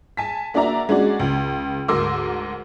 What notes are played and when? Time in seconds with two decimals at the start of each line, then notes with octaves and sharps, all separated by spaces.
0.17 G#5 A5 B6
0.54 A#3 D4 F#4 D5 E5 A#5
0.89 G#3 C#4 D4 F#4 D5
1.20 C#2
1.88 D2 G#2 A#4 C6 D6 E6